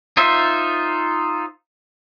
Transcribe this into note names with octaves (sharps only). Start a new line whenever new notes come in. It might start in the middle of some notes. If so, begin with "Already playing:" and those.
D#4 F4 C5 E5